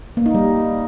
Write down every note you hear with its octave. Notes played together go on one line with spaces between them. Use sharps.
A#3
D#4
G3